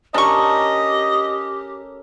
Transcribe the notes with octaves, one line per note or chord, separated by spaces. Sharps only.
C#4 D4 G4 A4 A#4 D#5 C#6